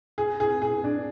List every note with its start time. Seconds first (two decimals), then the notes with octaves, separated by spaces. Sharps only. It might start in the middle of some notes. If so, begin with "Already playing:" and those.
0.18 G#4
0.40 G#4
0.62 G#4
0.84 D4